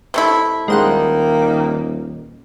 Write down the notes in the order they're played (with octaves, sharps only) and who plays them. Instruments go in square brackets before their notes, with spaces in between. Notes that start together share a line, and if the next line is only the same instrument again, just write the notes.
[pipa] C3 A3 E4
[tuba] D#1 [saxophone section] D#3 A#3 [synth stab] G#3 C5 F#5